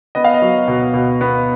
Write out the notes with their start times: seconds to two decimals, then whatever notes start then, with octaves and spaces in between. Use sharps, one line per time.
0.15 B3 D#5
0.24 F5
0.34 D#5
0.42 F#3
0.68 B2
0.94 B2
1.21 B3